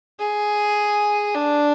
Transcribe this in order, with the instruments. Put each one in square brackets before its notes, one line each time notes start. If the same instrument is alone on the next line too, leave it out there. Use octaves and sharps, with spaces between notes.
[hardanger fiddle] G#4
D4